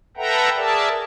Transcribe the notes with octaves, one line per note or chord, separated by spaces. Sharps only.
A4 B4 E5 F#5 G5 A#5
G#4 A#4 D5 E5 A5